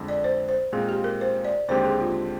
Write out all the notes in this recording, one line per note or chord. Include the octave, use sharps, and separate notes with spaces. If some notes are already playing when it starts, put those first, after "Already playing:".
Already playing: F2 D3 G#3
D5
C5
C5
A#2 G#3 C4 F4 G#4
G4
A#4
C5
D5
D#2 D3 G#3 C4 G4 C5
G#4
F4